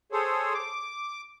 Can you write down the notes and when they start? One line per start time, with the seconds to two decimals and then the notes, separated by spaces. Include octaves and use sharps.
0.12 G#4 A4 C5 C#5
0.54 D6